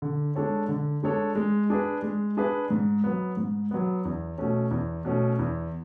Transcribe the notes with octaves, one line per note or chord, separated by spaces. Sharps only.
D3
G#3 D4 A4 C#5
D3
G#3 D4 A4 C#5
G#3
D4 G#4 B4
G#3
D4 G#4 B4
G#2
F#3 B3
G#2
F#3 B3
E2
B2 A3 C#4
E2
B2 A3 C#4
E2